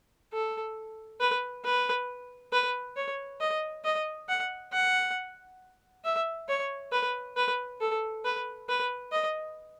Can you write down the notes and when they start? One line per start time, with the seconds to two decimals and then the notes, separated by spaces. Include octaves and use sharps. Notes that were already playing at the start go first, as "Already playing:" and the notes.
0.33 A4
1.20 B4
1.65 B4
2.53 B4
2.97 C#5
3.40 D#5
3.84 D#5
4.29 F#5
4.73 F#5
6.04 E5
6.49 C#5
6.92 B4
7.36 B4
7.81 A4
8.25 B4
8.69 B4
9.12 D#5